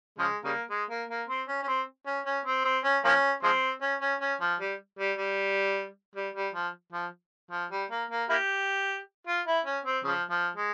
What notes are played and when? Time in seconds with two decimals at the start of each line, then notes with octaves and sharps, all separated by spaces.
0.19 C#3 F3 G#3
0.45 C#3 G3 A#3
0.70 G#3
0.90 A#3
1.09 A#3
1.29 C4
1.48 C#4
1.63 C#4
1.68 C4
2.06 C#4
2.26 C#4
2.46 C4
2.65 C4
2.84 C#4
3.04 F3 A#3 C#4
3.43 F3 G#3 C4
3.82 C#4
4.01 C#4
4.21 C#4
4.41 F3
4.60 G3
4.99 G3
5.18 G3
6.15 G3
6.35 G3
6.54 F3
6.92 F3
7.51 F3
7.71 G3
7.90 A#3
8.10 A#3
8.29 A#3 E4 G4
9.27 F4
9.46 E4
9.65 C#4
9.85 C4
10.04 C#3 F3
10.30 F3
10.56 G#3